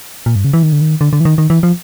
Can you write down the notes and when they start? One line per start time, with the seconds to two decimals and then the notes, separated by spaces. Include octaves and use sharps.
0.26 A#2
0.36 G2
0.45 C#3
0.53 E3
0.63 D#3
0.72 D3
0.81 D#3
1.01 D3
1.13 D3
1.20 E3
1.25 D#3
1.38 D#3
1.50 E3
1.63 F3